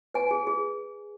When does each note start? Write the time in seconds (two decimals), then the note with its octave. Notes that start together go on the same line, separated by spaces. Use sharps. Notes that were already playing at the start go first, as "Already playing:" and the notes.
0.14 B4 G#5
0.31 G#4
0.47 G#4